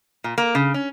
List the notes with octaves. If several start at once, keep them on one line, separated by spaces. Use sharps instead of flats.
A#2
A#3
C#3
C#4